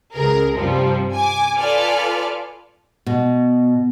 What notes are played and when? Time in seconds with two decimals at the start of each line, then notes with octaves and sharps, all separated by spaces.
0.14 C#2 G#4 A#4
0.55 G2 C3 F3 G3
1.14 G#5 D6
1.58 F4 A4 B4 D5 G#5 F6
3.06 B2